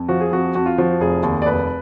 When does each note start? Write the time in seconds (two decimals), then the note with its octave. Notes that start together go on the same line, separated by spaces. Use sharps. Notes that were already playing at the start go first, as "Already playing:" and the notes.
Already playing: F2
0.09 F3 F#4
0.21 G#4
0.32 F2 F#4
0.55 F2 F#4
0.66 F4
0.78 F3 F#4
1.00 F1 G#4
1.23 D#2
1.42 D5
1.46 F1 B4